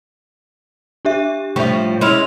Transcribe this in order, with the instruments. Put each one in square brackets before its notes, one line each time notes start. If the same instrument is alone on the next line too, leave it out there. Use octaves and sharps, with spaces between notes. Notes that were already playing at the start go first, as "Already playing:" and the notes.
[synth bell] D4 G4 E5
[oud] A2 F3 G3 [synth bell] E5 C#6
[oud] G#3 C#4 E4 [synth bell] C6 F6 F7